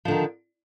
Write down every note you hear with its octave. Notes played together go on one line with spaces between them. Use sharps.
D3 D#3 F3